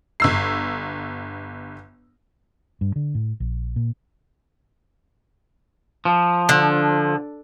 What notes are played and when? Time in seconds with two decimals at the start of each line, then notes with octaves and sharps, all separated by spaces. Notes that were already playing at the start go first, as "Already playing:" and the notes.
0.20 G1 E6 C7
2.81 G2
2.96 D3
3.15 A2
3.40 A#1
3.76 A#2
6.05 F3
6.49 D3